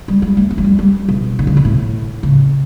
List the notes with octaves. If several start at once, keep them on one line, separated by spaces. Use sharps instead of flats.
G3
G3
A3
A3
F#3
G3
G3
B2
D3
C#3
B2
A2
C#3